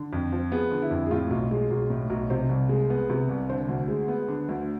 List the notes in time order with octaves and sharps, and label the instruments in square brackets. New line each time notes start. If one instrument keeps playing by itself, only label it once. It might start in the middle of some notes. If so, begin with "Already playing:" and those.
Already playing: [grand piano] D3
F2
F3
B3 G#4
D3
E4
F2
G#4
A2 F4
B1
G#3
B1
A2
B1
C3 C5
C2
G#3
B3
C3
C2
D3 C5
D2
G#3
B3
D3
D2